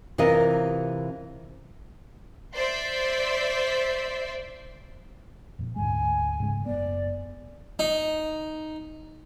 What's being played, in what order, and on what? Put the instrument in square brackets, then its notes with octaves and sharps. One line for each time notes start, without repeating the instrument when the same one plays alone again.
[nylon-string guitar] C3 E3 F4 A#4 D#5
[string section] C5 D5 E5 C6
[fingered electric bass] F2 A#2
[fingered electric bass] D2 G#2 G#3 [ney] G#5
[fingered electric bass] G#2 C#3 G#3
[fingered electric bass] F#1 B3 [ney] D5
[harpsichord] D#4